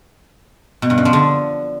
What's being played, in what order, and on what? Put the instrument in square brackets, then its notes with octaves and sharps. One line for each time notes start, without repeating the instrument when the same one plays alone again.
[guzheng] B2
G2
F#2
F3
D3